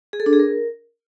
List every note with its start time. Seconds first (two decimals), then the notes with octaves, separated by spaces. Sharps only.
0.13 G#4
0.20 A4
0.26 D4
0.33 G#4
0.39 A#4